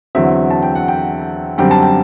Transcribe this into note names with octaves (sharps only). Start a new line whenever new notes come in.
E2 D3 F#3 C4 E5
A5
G5
F#5
G5
F#2 D3 G3 C4 G5
A5
G5